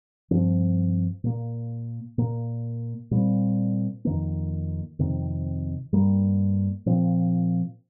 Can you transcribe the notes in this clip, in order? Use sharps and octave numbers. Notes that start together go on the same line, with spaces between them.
G2 F3 C4
A#2 A#3
A#2 A#3
A#2 G3 C4
F2 D#3 A#3
F2 C3 D#3 C4
G2 G3 A#3
A#2 F3 C4